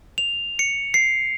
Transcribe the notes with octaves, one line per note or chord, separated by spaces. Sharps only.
F7
C#7
C7